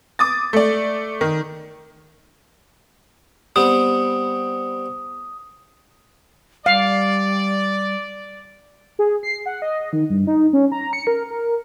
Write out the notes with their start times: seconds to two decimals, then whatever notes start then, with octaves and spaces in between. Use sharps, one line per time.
0.19 D6 D#6 A6
0.53 A3 D5
1.21 D#3
3.56 G3 B3 C4 D#6
6.66 G3 D5 F5
8.99 G#4
9.23 C7
9.46 F#5
9.62 D#5
9.93 D#3
10.10 G2
10.27 D#4
10.53 C#4
10.72 A#5
10.93 C#7
11.07 A#4
11.30 A#4